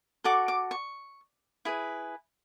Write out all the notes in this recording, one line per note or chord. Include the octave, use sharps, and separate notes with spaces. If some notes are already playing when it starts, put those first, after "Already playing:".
F#4 A4 D5 D6
D6
C#6
E4 G#4 B4